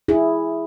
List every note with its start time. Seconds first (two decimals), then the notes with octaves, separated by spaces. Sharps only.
0.08 E4 G#4